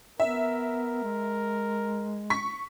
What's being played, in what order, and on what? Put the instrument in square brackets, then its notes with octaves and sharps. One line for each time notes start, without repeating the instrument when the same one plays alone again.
[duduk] B3 [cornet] A#4 [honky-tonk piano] E5
[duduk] G#3
[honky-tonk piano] C#6 B6